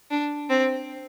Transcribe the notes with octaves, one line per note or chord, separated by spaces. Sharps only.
D4
C4